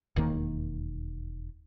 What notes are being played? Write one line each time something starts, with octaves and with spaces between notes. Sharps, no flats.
E1 D#2 D#3 A#3